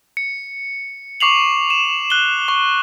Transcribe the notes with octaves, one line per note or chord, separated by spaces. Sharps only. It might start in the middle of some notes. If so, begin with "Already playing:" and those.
C#7
C#6 D6 C7 F7 F#7
E7
F#6 G7
C#6